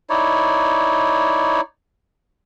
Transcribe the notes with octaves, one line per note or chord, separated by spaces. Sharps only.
D#4 E4 C#5 D5